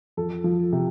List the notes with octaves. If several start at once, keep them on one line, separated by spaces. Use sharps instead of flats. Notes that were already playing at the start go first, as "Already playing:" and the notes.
F2 A4
F3
C3